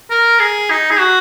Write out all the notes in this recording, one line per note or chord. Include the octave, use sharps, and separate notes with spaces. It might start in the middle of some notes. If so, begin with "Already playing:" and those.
A#4
G#4
D#4
G#4
F#4